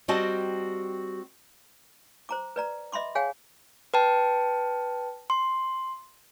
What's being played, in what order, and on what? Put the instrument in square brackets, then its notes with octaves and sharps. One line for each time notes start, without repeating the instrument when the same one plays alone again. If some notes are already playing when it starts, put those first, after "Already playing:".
[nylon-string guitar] G3 C4 F#4 D#5 G5 A5
[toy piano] C5 A#5 D6
B4 D5 A#5
D#5 E5 B5 C6 D6
G#4 C#5 F5 G5 G#5
[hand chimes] B4 G5 A5
C6